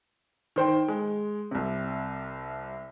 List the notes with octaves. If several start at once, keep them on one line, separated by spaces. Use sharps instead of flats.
D#3 C5 G5
G#3
C2 C3